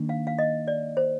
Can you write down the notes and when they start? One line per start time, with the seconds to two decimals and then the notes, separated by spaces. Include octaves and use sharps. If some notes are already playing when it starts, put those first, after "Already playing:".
Already playing: D#3 A#3 D4
0.09 F5
0.27 F5
0.39 D#5
0.68 D5
0.97 C5